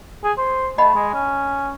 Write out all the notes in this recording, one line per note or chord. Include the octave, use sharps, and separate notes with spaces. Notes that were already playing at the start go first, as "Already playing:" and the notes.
G#4
C5
A3 D#5 F#5 B5
G#3
C#4